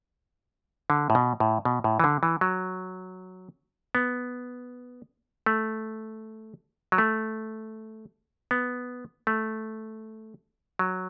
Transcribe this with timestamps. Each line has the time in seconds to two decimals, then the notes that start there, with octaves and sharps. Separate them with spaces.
0.90 D3
1.10 A2
1.15 B2
1.40 A2
1.65 B2
1.84 A2
2.00 E3
2.04 D3
2.23 E3
2.41 F#3
3.95 B3
5.46 A3
6.92 F#3
6.98 A3
8.51 B3
9.27 A3
10.79 F#3